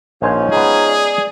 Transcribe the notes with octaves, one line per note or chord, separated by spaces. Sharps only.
A#1 F3 C#4 D#4 C5 G#5
G#3 B3 G#4 A#5
D5